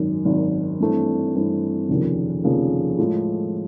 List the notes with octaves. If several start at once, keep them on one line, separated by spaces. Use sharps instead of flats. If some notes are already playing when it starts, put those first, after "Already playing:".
Already playing: G#1 F#2 D#3
G#1 F#2 D#3
G2 E3 A3 C4
G2 E3 A3 C4
F1 D#2 C#3 F3 A#3
F1 D#2 C#3 F3 A#3
A2 F3 G#3